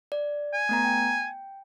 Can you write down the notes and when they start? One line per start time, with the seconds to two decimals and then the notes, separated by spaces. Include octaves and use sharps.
0.12 D5
0.53 G#5
0.69 A3 B3 A#5
0.85 G5